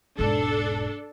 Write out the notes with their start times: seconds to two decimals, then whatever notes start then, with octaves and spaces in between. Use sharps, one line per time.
0.19 E1 G#2 D4 A4